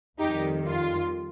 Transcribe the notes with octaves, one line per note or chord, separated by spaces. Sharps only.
F2 D#3 G3 D#4 G4
F4